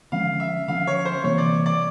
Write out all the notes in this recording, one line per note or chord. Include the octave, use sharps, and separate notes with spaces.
D3 F3 G#3 C#4 F5
E5
D3 F3 G#3 C#4 F5
C#5
C5
C3 E3 G3 A#3 C#5
D5
D5